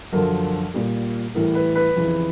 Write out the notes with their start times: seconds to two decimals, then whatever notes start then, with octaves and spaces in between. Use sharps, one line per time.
0.12 F#2 D3 F3 A#4
0.74 A#2 G3
1.35 A2 E3 G3 A#4
1.55 B4
1.76 B4
1.96 F2 C#3 E3